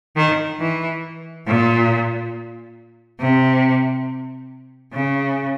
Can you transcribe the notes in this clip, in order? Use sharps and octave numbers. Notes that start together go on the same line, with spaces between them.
D#3
E3
A#2
C3
C#3